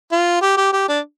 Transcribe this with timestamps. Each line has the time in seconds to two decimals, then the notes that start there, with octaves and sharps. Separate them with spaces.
0.12 F4
0.42 G4
0.57 G4
0.73 G4
0.89 D4